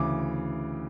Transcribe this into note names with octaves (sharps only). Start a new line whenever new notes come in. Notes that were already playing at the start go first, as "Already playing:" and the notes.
Already playing: D2 C#3 E3 D6